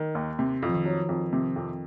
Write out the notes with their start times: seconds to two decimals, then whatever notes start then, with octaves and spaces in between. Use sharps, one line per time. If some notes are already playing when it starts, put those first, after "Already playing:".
Already playing: D#3
0.15 D#2
0.39 C3
0.62 F2
0.69 F3
0.74 D#3
0.85 F#3
1.09 F2
1.33 C3
1.56 F2